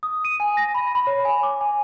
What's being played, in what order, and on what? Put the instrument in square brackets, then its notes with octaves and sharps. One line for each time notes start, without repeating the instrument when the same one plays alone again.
[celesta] D#6
D#7
G#5
A#6
B5
B5
C#5
G#5
D6
G#5